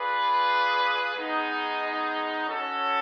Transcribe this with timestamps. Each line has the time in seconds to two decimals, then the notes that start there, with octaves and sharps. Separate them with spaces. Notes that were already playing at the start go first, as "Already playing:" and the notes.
Already playing: F4 G#4 B4 D5
1.15 G#3 B3 D#4 G#4
2.46 C#4 F#4 A4 C#5